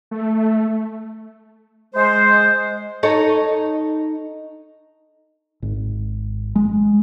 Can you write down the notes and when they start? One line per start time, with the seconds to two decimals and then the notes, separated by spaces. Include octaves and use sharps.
0.11 A3
1.94 G#3 C5
3.03 D#4 A4 C#5
5.62 G#1
6.56 G#3